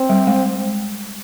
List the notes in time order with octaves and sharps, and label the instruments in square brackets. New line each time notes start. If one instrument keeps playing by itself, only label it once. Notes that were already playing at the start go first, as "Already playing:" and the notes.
Already playing: [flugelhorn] C4
[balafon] G3
G#3